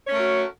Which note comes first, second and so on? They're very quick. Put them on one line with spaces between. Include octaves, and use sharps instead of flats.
C#5 C#4 A3 A#4 F#4